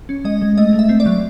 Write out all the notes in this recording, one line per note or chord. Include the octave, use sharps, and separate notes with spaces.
C#4
G#3 D#5
G#3
A3 D#5
A3
E5
C4
D5
F#3